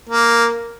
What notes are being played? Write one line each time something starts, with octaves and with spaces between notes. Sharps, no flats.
A#3